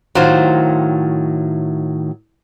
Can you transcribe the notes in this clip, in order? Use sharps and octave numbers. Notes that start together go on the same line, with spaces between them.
A2 D#3 F#3 F4 C5